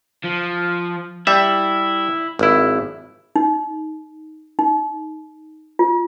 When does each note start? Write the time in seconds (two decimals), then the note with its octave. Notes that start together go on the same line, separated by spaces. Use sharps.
0.24 F3
1.27 G3 E4 E5
2.39 G#1 E4
3.36 D#4
4.59 D#4
5.79 F4